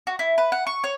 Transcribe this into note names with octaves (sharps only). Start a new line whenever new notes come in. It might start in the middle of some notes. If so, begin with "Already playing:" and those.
F#4
E4
B4
F#5
C#6
C#5